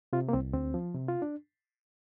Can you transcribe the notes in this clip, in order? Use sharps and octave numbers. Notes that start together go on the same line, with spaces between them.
C3 F4
A#3
C2 C4
D2 C4
F3
C3
F4
D4